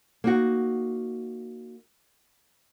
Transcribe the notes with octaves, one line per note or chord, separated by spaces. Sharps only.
A#3 D#4 F#4